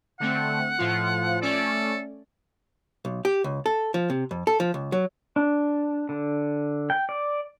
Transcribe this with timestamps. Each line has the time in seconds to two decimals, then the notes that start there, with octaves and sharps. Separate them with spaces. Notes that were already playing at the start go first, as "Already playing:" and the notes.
0.20 D3 A3 C4 F#5
0.78 A2 F3 F4
1.42 A3 C#4 A4 D5
3.05 B1
3.25 G4
3.44 C#2
3.66 A4
3.94 F3
4.10 C3
4.31 F2
4.47 A4
4.60 F3
4.74 C#2
4.92 F#3
5.36 D4
6.09 D3
6.90 G5
7.09 D5